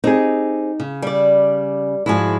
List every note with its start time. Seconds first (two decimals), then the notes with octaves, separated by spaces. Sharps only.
0.04 C4 D#4 G4 G#4
0.80 C#3
1.02 G3 D5
2.06 G#2 F3 G#3 E4 F#4 G#4